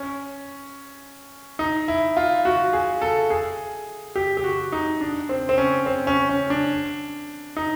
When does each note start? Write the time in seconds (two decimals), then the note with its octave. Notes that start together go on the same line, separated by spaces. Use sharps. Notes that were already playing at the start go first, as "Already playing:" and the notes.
Already playing: C#4
1.59 D#4
1.88 E4
2.17 F4
2.45 F#4
2.73 G#4
3.02 A4
3.30 G#4
4.16 G4
4.37 G4
4.44 F#4
4.72 D#4
5.01 D4
5.29 C4
5.49 C4
5.58 C#4
5.86 C4
6.07 C#4
6.29 C#4
6.50 D4
7.57 D#4